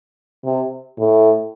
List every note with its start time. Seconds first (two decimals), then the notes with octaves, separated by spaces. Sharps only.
0.44 C3
0.98 A2